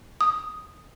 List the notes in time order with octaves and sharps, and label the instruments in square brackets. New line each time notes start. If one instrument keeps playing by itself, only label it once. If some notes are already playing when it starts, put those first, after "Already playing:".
[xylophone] D#6